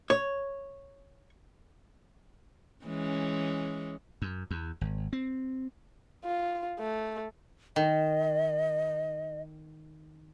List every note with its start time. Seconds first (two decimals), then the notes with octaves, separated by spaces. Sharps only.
0.10 C#5
2.85 E3 G#3 C#4
4.22 F#2
4.51 E2
4.81 G#1
5.13 C4
6.25 F4
6.80 A3
7.76 D#3 D#5